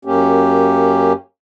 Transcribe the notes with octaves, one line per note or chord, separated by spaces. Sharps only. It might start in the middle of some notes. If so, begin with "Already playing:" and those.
F#2 A#3 C#4 G4